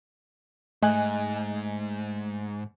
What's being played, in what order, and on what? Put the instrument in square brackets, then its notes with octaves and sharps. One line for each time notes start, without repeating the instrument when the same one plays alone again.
[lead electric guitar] G#2 [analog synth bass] A3 [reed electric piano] D#5 G#5 F#6